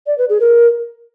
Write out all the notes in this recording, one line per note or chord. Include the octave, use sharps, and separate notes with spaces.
D5
B4
G#4
A#4